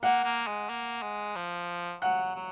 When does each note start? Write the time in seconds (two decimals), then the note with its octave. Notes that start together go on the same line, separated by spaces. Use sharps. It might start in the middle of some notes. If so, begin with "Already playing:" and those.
0.03 A#3 F#5
0.25 A#3
0.47 G#3
0.70 A#3
1.02 G#3
1.36 F3
2.02 F#3 F#5
2.36 F#3